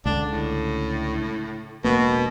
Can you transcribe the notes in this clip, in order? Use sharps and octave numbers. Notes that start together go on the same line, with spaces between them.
C#2 D3 D4
A2
E1 B2 A#3 B3